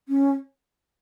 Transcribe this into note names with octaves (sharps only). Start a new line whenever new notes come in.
C#4